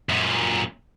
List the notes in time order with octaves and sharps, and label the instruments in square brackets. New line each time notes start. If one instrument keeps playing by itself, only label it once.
[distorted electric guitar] F#2 A#2